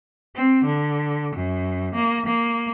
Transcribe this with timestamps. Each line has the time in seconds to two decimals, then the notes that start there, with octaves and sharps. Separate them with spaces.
0.35 C4
0.64 D3
1.35 F#2
1.95 A#3
2.26 A#3